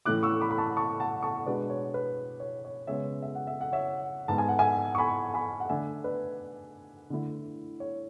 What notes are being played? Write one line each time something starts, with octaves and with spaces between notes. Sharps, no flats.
A2 E3 A3 C#4 E4 D6 F#6
C#6 E6
B5 D6
B5
A5 C#6
A5 C#6
F#5 A5
A5 C#6
B2 G#3 D4 B4 D5
C#5
B4
C#5
C#5
C#3 G#3 B3 C#5 E5
E5
F#5
E5
F#5
C#5 E5
G#2 G#3 B3 A5
G#5
F#5
E5 G#5
C#6
G#5 B5
G#5 B5
F#5
D3 A3 D4 E5 G#5
B4 D5
D3 A3 E4
C#5